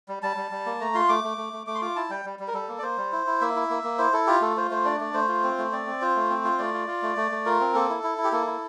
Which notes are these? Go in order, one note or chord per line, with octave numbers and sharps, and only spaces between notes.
G3
G3 A5
G3
G3
A#3
A3 A#5
F4 C6
A3 D6
A3
A3
A3
A3 D6
C6
F4 D6
E4 A5
G3 G5
G3
G3
A#4
G3 A4
A#3
D5
A#3 C5
G3
E4
E4
A#3 E5
E4
A#3
A#3
E4 C5
E4 A4
F4 G4
A3 A4
F4 C5
A3 C5
D4 D5
A3 D5
A3 C5
F4
C4
A3
C4 D5
C4
F4 C5
A3
C4
F4
A3 D5
F4
F4
A3
A3
A3
F4 A#4
C4
A#3 A4
E4
E4
E4
G4
A#3 A4
E4